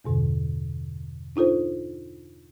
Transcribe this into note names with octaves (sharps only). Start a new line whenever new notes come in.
E2 G2 B2 D3
D4 D#4 F4 A4 C5